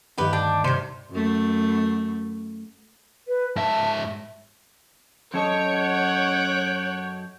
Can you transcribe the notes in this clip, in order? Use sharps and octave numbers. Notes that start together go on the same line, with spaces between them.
D2 G2 D#3 G4 B4
D4 G5
C3 C5 C#5
F#2 A3
B4
G#2 E5 A5
F#2 A4 C#5 D#5 G5
F#5